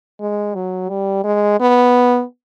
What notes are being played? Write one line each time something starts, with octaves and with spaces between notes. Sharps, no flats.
G#3
F#3
G3
G#3
B3